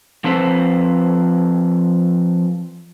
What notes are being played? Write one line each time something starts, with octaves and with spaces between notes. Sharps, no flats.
F3 C4 A4 B4 C5